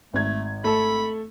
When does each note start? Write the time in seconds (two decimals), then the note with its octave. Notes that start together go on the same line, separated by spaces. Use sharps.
0.14 G#1 A3 G#6
0.64 A3 A4 B5